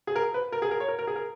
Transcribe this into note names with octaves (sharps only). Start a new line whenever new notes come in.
G#4
A#4
B4
A#4
G#4
A#4
C#5
A#4
A#4
G#4
A#4